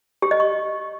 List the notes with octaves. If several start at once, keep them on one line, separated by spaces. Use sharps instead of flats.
G4
D#5
C#6